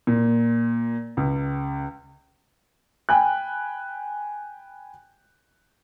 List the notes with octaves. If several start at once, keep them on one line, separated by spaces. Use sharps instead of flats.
A#2
C#2
G5 G#5 B5 F#6